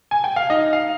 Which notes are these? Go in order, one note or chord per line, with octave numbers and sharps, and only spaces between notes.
G#5
G5
F5
D#4 D#5
F5